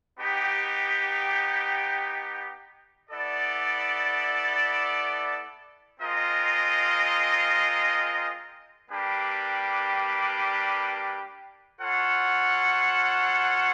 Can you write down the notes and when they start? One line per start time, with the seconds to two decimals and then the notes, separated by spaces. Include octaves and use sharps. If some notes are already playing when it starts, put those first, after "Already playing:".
0.20 B3 D#4 G4
3.10 B3 E4 A4 D5
6.00 G#3 C4 F4 A#4 D#5
8.90 G3 A#3 D4 G4 B4
11.80 F4 A4 C#5 F#5